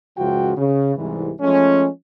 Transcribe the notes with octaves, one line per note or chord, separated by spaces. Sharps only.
C#2 F#2 C#3 F3 F#4 G5
C#3
C2 G#2 E3
F3 G#3 A3 C#4